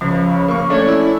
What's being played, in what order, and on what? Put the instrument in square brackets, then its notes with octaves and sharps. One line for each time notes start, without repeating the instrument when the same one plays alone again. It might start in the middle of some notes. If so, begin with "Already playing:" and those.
[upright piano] C#2 [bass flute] C#3 [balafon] F3 C5
[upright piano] A#3 C#6
[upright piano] A3 D4 [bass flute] C#4 [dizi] C#5
[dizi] E4